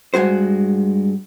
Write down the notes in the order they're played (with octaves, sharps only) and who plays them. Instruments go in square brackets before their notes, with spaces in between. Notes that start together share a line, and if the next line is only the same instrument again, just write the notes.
[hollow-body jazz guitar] G2 G#3 F#4 C5